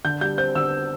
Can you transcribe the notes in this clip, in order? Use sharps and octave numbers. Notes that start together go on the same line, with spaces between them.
D3 G6
G3 G6
C4 G6
D3 E6